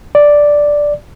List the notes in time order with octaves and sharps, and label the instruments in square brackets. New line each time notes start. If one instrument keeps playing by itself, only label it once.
[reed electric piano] D5